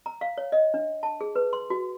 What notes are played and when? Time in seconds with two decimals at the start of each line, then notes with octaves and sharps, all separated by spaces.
0.06 A#5
0.21 F5
0.38 C#5
0.52 D#5
0.74 D4
1.03 A5
1.21 G#4
1.36 B4
1.53 C6
1.70 F#4